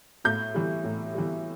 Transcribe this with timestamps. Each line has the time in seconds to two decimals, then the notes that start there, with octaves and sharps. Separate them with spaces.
0.25 A2 G6
0.54 E3 G3
0.84 A2
1.14 E3 G3